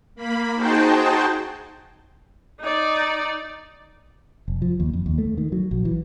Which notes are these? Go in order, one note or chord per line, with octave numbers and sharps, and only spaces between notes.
A#3 B5
D#4 F#4 G#4 C5 G5 A5
D#4 D5
F1
F3
D#2
F2
D#2
A3
D#3
F#3
A#1
E3